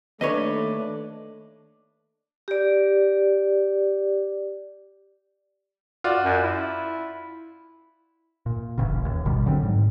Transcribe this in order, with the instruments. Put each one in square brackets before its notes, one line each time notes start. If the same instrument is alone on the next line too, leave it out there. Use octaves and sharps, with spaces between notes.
[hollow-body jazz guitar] D#2 B4 C#5 [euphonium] A3 [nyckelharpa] D4 [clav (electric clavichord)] D#5
[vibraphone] G4 D5
[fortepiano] F4 F#4 D5
[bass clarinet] F#2
E4
[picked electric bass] A#2
D#1 A1 C#3
D#2
G#1 B2 D#3 G3
D3 F#3 G3 C4
G#2